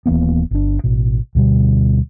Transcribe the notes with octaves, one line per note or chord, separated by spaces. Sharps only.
D#1 E3 A#3 B3
G1 D4
A1 B2
D2 B2 G3